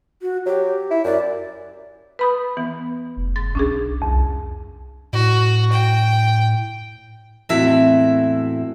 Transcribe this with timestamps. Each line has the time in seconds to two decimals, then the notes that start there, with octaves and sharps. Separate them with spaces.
0.22 F#4
0.46 F#3 G4
0.91 E4
1.05 F#2 D5
2.19 B4 B5 D#6
2.57 E3 B3
3.17 F1
3.36 G#2 A6
3.55 B1 C#4 D4 G#4
4.02 C2 F2
5.13 A2 F#4
5.72 G5
7.49 E2 A2 C4 E4 F#4 E5